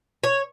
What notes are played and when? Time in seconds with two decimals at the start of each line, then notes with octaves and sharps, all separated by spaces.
0.24 C#5